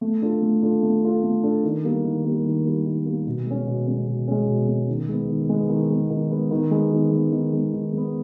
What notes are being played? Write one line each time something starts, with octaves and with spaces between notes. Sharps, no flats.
A3
D4 F4 A4
A3
D4 F4 A4
A3
D4 F4 A4
A3
D4 F4 A4
D#3
G3 A#3
D#3
G3 A#3
D#3
G3 A#3
D#3
G3 A#3
B2
G#3 C#4
B2
G#3 C#4
B2
G#3 C#4
B2
G#3 C#4
D#3
G#3 B3
D#3
G#3 B3
D#3
G#3 B3
D#3
G#3 B3
D#3
G#3 B3
D#3
G#3 B3
D#3
G#3 B3
D#3
G#3 B3